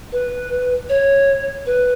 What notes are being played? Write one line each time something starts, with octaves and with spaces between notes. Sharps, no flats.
B4
C#5
B4